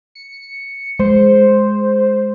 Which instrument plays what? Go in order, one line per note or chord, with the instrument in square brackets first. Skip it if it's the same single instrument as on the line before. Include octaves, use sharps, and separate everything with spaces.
[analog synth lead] C#7
[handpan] G#3 [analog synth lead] C5